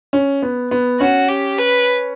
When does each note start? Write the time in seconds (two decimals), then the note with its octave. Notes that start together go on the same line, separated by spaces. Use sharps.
0.13 C#4
0.42 B3
0.71 B3
1.00 C#4 F#4
1.29 G4
1.58 B4